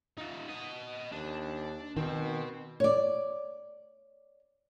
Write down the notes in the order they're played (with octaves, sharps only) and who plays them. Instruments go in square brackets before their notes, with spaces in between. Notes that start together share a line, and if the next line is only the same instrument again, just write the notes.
[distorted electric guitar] D#4 F4
B3 D#5
[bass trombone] D#2 [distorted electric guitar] D4 A5
[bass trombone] B2 [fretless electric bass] D#3 [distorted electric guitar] C4
[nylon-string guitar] C#5 D5